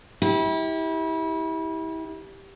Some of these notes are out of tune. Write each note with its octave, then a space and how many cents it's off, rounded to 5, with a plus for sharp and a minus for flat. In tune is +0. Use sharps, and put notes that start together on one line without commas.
E4 -30 G4 +0